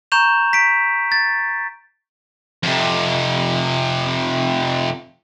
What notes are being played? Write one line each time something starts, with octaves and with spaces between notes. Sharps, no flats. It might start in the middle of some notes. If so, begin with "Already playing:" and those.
A#5 C#6 G6 E7 F7
B6 D7
A6
F2 C3